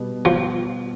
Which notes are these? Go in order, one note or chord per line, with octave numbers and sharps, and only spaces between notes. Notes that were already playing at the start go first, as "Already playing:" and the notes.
Already playing: B2 G3 B3
F3